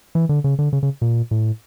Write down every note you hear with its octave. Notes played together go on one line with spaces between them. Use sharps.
E3
D3
C#3
D3
C#3
C#3
A#2
A2